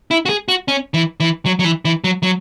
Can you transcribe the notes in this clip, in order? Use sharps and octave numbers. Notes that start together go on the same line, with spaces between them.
E4
F#4
G#4
F#4
C#4
E3
E3
F#3
F#3
E3
E3
F#3
F#3